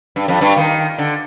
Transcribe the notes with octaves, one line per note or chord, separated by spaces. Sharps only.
G2
F2
G2
D#3
D3